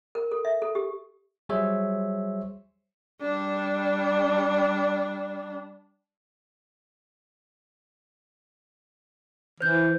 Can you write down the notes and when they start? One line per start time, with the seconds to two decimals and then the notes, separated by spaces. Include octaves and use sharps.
0.15 A#4
0.32 A4
0.45 E5
0.62 A4
0.75 G4
1.49 F#3 G3 G#4 C5 C#5 E5
3.22 G3 D4
9.61 E3 C5 G6